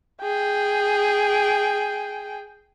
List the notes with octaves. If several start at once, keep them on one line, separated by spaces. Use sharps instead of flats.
G#4 G5